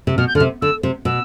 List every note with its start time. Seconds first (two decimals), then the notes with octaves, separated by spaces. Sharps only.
0.07 C3
0.18 B2 F6
0.28 G6
0.35 D3 F6
0.40 C3
0.62 D3 E6
0.83 C3
1.05 B2 E6